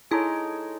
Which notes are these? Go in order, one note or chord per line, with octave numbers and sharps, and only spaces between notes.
G#3 D#4 E4 A4 C#5